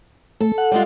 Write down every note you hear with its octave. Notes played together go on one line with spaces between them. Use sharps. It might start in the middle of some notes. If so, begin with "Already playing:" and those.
A3 A4
F#5
G3 G#3 F4